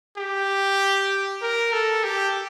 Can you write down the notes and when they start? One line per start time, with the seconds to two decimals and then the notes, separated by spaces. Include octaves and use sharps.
0.17 G4
1.42 A#4
1.73 A4
2.03 G4